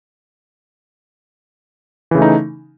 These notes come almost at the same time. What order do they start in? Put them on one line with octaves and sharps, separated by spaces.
E3 C#3 A3 D#4